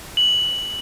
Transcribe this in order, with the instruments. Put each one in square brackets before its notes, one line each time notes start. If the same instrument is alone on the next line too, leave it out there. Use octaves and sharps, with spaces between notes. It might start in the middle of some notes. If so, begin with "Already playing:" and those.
[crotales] F#7